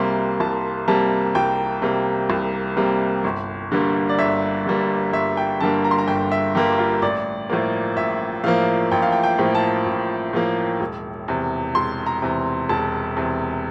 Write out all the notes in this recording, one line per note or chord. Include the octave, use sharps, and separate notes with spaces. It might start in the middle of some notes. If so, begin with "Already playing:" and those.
Already playing: C2 C3 G3 A#3 C6
C2 A5
C3 G3 A#3 A5
C2 G5
C3 G3 A#3
C2
C3 G3 A#3
G1
G2 D3 G3 A#3
D5
G1 E5
G2 D3 G3 A#3
G1 E5
G5
G2 D3 G3 A#3 A5
A#5
C6
A#5
G1 G5
E5
G2 D3 G3 A#3 G4
F4
A1 D5
A2 F3 A#3
A1 E5
A2 F3 A#3 F5
A1 G5
F5
G5
G5
A2 F3 A#3
A5
A1
A2 F3 A#3
E1
E2 C3
E1 C6
A#5
E2 C3
E1 A5
E2 C3